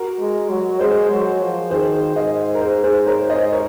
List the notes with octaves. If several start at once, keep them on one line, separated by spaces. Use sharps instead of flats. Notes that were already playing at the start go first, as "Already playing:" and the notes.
Already playing: F#4 A#4
G#3
F#3
G#3 G#4 C5
F#3
F3
D#3 G#4 C5
G#2 C5 D#5
A#4
G#4 C5
G#4 C5
A#4 C#5
C5 D#5
A#4 C#5